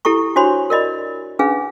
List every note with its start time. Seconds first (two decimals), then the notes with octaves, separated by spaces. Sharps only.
0.05 E4 G4 A4 A#5 C#6
0.36 D4 F#4 C5 C#5 B5 C6
0.70 A#4 D5 D#5 B5
1.39 C#4 D4 G#4 B4 F5